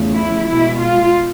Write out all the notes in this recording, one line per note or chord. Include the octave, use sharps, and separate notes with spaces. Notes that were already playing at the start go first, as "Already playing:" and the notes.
Already playing: E2 C#3 F3 A3
E4
B2 G#3 E4
F4